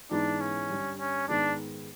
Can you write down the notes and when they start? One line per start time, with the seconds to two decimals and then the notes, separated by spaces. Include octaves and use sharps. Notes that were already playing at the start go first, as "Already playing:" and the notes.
0.11 G#2 E3 G#3 B3 D4 D#4
0.41 C#4
0.70 G2 D3 G3
0.99 C#4
1.28 G#2 D#3 G#3 B3 D4